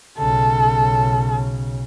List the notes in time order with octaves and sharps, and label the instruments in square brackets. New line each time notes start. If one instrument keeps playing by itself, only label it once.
[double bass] B1 C#3 [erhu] A4